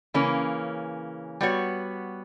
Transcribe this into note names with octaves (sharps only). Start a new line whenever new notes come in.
C#3 E3 A#3 C#4
G3 B3 F#4 C#5